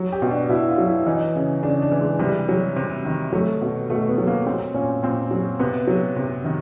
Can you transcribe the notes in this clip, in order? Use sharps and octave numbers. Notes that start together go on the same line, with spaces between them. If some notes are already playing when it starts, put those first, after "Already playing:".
Already playing: F#3
G4
B2
D4
B2 E4
F4
F#3
E4
E3 D#4
C#3
C#3 D4
D4
E3
G#3
C3 G3
F#3
C3
D#3
F#3 A3
B2
B2 A3
B3
F#3
A#3
F#3 C4
A#2 C#4
A#2 C4
F#3
C3 B3
F#3
C3
D#3